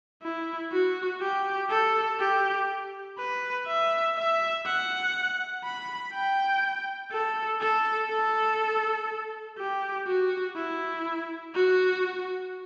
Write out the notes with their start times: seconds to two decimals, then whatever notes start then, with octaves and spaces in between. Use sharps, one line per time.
0.23 E4
0.72 F#4
1.21 G4
1.70 A4
2.19 G4
3.18 B4
3.67 E5
4.16 E5
4.66 F#5
5.64 B5
6.13 G5
7.12 A4
7.61 A4
8.10 A4
9.58 G4
10.07 F#4
10.56 E4
11.55 F#4